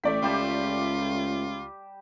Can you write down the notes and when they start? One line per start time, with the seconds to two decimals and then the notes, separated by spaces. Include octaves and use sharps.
0.04 A1 A3 D5 G5 D6 B6
0.22 C#2 G3 F4 G4 A5